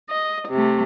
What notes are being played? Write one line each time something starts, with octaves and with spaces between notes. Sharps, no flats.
D#5
C3 A3